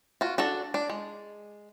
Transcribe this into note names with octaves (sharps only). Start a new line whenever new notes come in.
F4 F#4
D4 F#4 A4
D4
G#3